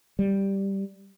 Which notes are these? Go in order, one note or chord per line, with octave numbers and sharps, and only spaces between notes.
G3